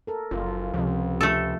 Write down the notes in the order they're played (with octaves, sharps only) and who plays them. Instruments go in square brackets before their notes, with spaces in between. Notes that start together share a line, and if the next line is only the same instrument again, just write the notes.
[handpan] A4 A#4
[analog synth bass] F#1 [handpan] F4
[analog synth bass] C#2 [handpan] C3 F3
[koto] A3 A4